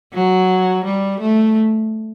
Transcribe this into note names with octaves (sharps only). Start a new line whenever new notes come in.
F#3
G3
A3